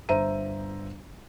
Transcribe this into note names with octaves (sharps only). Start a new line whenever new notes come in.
G1 C5 E5 A#5 D#7